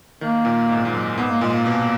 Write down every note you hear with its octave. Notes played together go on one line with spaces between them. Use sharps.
D#3 A#3
A#2
G#2
A#2
G#2
F#2
G#2 B3
A#3
A#2 G#3
A#3
B2